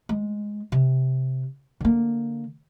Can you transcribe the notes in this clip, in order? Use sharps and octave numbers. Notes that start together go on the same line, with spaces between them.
G#3
C3
D3 A#3